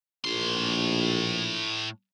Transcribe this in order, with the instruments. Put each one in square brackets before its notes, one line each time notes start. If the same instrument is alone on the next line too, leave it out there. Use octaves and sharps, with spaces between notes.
[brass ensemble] A#1 [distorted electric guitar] A2 C6